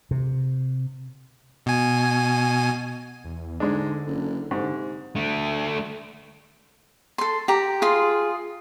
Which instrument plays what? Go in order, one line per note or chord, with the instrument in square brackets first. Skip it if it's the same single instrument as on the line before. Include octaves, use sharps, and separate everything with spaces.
[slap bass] C3
[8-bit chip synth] B2 G#5
[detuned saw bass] E2
[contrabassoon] G#2 [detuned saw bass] D3 [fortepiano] G#3 D4
[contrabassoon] F#1
[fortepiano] G#2 [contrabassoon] C3
[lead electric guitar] D3 A3
[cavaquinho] A4 C6
G4 A#5
[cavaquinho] F4 C6 [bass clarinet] G#4